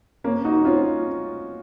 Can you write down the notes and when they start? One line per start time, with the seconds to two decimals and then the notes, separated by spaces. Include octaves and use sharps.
0.24 A#3 C#4
0.44 D#4 F#4
0.65 C#4 F4